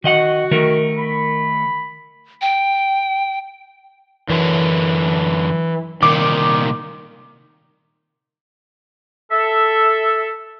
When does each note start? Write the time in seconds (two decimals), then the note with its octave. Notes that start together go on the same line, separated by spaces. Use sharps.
0.04 D#3 F#4 D#5 F#5
0.51 D#3 A3 A#4
0.97 B5
2.41 G5
4.30 F#2 D3 E3
6.03 C2 A#2 D#3 D6
9.32 A4 E5